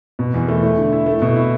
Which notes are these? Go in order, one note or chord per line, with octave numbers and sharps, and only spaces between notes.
B2
E2
A3
A3
D3
E4
A3
B2
E4